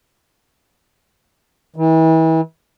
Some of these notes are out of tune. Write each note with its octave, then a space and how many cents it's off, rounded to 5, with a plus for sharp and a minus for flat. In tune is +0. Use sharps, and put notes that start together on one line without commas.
E3 -35